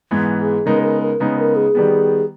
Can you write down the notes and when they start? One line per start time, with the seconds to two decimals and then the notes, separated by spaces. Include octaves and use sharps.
0.11 G#2 E3 G#3 B3
0.39 G#4
0.66 C#3 G#3 B3 D#4 A#4
0.83 A#4
1.02 A#4
1.20 C#3 G#3 B3 D#4 B4
1.39 A#4
1.56 G#4
1.75 D#3 G3 B3